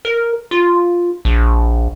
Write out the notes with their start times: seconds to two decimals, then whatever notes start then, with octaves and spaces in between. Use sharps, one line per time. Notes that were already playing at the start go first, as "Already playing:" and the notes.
0.05 A#4
0.51 F4
1.25 A#1